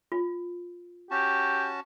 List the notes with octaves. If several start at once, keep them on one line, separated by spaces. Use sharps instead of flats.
F4
C#4 F#4 G4 A5